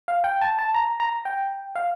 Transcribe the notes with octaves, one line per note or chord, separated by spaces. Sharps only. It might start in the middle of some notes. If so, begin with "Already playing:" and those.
F5
G5
A5
A5
A#5
A#5
G5
F5